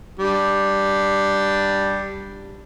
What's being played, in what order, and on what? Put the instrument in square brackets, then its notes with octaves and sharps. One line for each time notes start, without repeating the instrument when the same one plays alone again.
[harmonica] G3 D4